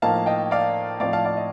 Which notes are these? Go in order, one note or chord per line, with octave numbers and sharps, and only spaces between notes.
A2 F3 A#3 D#4 F5 A5
D#5 G5
D5 F5
A2 F3 C4 D#4 D5 F5
F5 A5
D5 F5
D#5